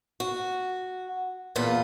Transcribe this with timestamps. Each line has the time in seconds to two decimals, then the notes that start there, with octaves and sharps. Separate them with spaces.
0.20 F#4
1.55 E2 A#2 F4 B4